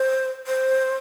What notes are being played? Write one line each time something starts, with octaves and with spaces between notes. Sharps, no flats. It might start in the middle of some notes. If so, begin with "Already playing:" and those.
Already playing: C5
C5